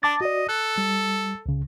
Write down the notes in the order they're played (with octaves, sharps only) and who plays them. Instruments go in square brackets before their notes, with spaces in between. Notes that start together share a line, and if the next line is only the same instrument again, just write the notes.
[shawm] D4 [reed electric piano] A5 D6 A6
[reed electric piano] F#4 D5 [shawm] D#5
[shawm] A4 [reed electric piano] F#6
[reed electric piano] G3
C#2 C#3